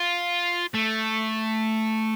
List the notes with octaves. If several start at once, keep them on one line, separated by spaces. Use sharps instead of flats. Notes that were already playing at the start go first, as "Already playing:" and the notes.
Already playing: F4
A3